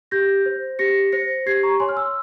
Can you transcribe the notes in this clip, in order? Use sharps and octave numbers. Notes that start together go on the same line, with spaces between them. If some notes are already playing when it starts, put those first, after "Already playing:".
G4 G6 A#6
C5
G4 A#6 C#7
C5 A#6 C#7
G4 G#6 C7
A#5 C#6
C#5 G#5 C6
F6
C6 E6